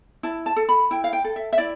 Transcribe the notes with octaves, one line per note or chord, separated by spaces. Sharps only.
E4 A5
A5
A4
B5
E4 G5
F5
G5
A4
E5
E5
E4 D5